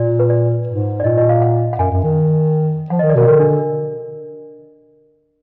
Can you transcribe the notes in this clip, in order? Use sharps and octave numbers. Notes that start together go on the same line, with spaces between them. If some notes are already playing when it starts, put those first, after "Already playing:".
Already playing: A#2 D5
B4
D5
G#2
D5
A#2 D#5
D#5
F5
F#5
F#5
F#2 G#5
F#2
D#3
F3 F#5
D#3 D#5
D5
B2 A#4
D3 A#4
D4